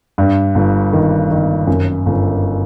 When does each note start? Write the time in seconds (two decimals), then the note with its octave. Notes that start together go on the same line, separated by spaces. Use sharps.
0.18 G2
0.55 G1
0.93 D#3
1.31 D#3
1.67 F#2
2.06 G1